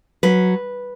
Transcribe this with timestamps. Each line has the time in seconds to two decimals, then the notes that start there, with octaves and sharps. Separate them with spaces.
0.23 F#3 B4